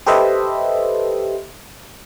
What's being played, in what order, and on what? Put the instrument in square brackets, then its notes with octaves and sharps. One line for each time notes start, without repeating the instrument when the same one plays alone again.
[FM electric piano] G4 A4 B4 C5 D#5 E5